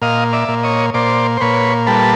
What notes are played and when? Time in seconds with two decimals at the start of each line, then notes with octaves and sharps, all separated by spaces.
0.02 A#2 D#5 F5
0.33 D5 E5
0.48 A#2
0.63 C#5 D#5
0.94 A#2 C5 D5
1.37 C5
1.41 A#2 B4 C#5
1.87 G3 A4 B4